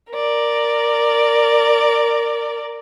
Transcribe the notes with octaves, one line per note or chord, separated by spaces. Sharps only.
A#4 D5